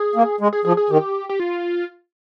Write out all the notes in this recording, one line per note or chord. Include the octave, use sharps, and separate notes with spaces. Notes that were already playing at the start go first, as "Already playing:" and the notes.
Already playing: G#4
A#3
G#3
G#4
F3 G#4
G#4
D#3 G4
G4
F4